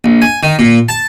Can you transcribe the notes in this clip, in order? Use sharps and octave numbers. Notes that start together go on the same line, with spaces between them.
A#1
G#5
D#3
A#2
A5